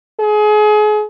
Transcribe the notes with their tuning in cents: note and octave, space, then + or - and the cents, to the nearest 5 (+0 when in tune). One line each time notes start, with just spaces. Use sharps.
G#4 +30